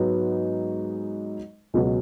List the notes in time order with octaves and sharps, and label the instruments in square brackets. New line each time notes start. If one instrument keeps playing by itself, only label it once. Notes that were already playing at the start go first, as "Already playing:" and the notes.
Already playing: [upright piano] G#2 F#3 B3 D#4
C#2 B2 F#3